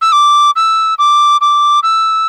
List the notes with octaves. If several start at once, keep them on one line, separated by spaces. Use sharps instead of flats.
E6
D6
E6
D6
D6
E6